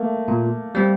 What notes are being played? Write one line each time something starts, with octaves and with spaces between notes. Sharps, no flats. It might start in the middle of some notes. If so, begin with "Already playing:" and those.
Already playing: A3 A#3
A#2
G3 C4